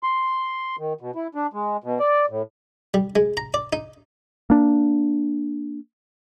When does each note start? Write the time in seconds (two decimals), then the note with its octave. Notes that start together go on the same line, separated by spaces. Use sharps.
0.03 C6
0.78 D#3
1.01 B2
1.15 E4
1.35 D4
1.53 G#3
1.84 B2
2.00 D5
2.30 A2
2.94 G3
3.16 G#3
3.37 A#5
3.54 D5
3.73 D#4
4.50 A#3 D4